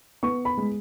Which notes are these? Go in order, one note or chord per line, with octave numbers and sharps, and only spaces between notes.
B3 C#6
B5
G#3